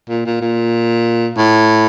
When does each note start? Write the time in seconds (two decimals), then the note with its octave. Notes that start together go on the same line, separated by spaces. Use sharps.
0.09 A#2
0.26 A#2
0.41 A#2
1.37 A2